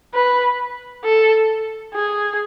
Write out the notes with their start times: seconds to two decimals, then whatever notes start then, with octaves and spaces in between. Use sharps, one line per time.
0.14 B4
1.05 A4
1.95 G#4